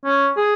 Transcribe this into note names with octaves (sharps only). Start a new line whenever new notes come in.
C#4
G#4